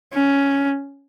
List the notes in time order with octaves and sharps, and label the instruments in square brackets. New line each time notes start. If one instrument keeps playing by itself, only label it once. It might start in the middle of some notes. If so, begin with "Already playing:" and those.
[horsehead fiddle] C#4